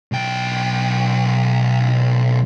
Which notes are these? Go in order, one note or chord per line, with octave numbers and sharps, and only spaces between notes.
B1 G5